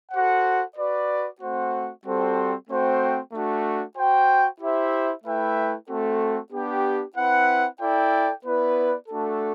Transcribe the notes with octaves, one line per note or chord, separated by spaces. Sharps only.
F#4 A4 C5 F#5
F#4 B4 D5
A3 C4 F#4 C5 F#5
G3 C4 F#4 A4 C5
A3 C4 F#4 C5 G5
A3 D4 F#4
F#4 C5 G5
E4 G4 C5 E5
A3 E4 B4 E5 G5
A3 C4 F#4 A4
B3 D4 G4
C4 E4 B4 F#5
E4 A4 D5 G5
B3 E4 B4 D5
A3 D4 F#4 A4